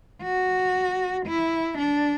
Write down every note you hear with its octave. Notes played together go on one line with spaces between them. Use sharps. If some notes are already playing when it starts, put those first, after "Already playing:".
F#4
E4
D4